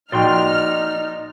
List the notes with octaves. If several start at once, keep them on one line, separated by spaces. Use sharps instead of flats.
A#1 D#4 F#4 D5 G5 C6 F6